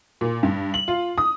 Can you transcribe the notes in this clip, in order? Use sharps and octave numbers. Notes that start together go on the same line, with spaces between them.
A#2
G2
F#7
F4
D#6